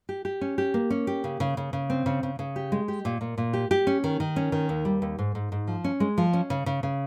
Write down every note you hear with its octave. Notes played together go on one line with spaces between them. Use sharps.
G4
G4
C#4
G4
A#3
C#4
G4
C#3
C#3
C#3
C#3
C4
C#3
C#3
C#3
G4
G#3
G4
A#2
A#2
A#2
G4
G4
C#4
D#3
D#3
C#4
D#3
D#2
G3
D#2
G#2
G#2
G#2
F3
C#4
G#3
F3
C#4
C#3
C#3
C#3